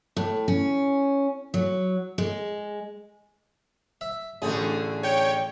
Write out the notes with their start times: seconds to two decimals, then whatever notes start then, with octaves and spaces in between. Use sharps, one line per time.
0.16 A2
0.48 C#4
1.54 F#3
2.18 G#3
4.01 E5
4.42 A1 D3 A3 G#4
5.03 C#5 G5